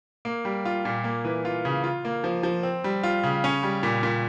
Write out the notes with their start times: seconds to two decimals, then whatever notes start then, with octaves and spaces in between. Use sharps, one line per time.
0.25 A#3
0.45 G3
0.65 F4
0.85 A#2
1.04 A#3
1.25 E3
1.45 F4
1.65 C#3
1.84 F4
2.05 A#3
2.24 F3
2.43 F3
2.63 C4
2.84 G3
3.03 F4
3.23 C#3
3.44 C#4
3.63 G3
3.83 A#2
4.03 A#2